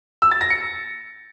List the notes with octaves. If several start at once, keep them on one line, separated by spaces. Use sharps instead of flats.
E6
A6
A#6
C#7